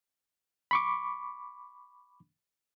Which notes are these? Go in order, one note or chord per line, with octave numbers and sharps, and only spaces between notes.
B5 C#6 D6